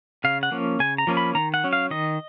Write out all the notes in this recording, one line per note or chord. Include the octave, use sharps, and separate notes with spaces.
C#3 F5
F#5
F3 A#3 C#4
C#3 G#5
A#5
F3 A#3 C#4
B5
D#3 A#5
F#5
F#3 C#4
F5
D#3 D#5